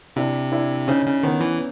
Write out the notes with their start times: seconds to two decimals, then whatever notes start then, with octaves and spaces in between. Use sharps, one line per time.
0.16 C3 D4 E4
0.52 D4 E4
0.88 C#3 C#4 D#4
1.06 C#3
1.23 D#3 B3 C#4
1.41 E3